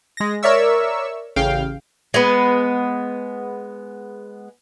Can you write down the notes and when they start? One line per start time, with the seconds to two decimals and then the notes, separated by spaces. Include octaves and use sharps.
0.17 G#3 A#6
0.43 A#4 C#5 D5 E5 C#6 E6
1.36 A1 C#3 F5 G5
2.14 G#3 B3